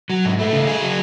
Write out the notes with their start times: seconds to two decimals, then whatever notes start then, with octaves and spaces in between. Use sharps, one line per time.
0.10 F#3
0.25 G#2
0.39 A3
0.53 C#3
0.67 G#4
0.81 F#3